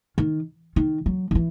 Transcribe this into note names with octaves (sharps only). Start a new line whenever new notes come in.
D#3
D#3
F#3
D#3
E3